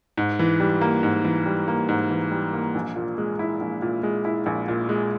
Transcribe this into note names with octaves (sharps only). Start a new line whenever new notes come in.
G#2
E3
G3
A#3
G#2
E3
G3
A#3
G#2
E3
G3
A#3
A#1
A#2
G#3
E4
A#1
A#2
G#3
E4
A#1
A#2
G#3